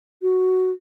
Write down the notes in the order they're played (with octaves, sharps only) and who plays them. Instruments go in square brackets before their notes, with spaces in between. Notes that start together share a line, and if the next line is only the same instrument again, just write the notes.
[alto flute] F#4